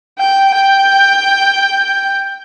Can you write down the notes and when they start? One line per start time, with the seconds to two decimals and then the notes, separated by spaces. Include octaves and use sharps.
0.19 G5
0.54 G5